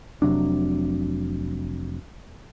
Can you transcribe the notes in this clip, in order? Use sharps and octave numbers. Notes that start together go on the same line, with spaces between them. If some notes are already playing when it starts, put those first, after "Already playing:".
F1 C3 F#3 D4